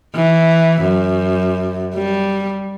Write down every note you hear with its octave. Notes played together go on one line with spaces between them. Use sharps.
E3
F#2
G3